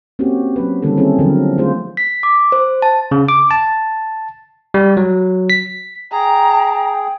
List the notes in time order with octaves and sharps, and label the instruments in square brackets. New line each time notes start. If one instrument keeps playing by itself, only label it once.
[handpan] A#3 C4 C#4 F#4 G4
F#3 C#4 B4
D3 D#3 G3 A#3 C#4 A4
C4 C#4 E4 G#4 A4
D3 F3 F#3 A#4
A3 B3 F4 G#4 C5
[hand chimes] B6
D6
C5
A5
[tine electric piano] C#3
D6
A5
G3
F#3
B6
[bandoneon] G#4 [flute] G5 [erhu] A#5